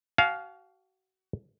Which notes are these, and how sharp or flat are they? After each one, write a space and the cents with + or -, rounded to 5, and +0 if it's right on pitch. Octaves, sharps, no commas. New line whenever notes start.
F#4 +30 F5 +0 G#5 +45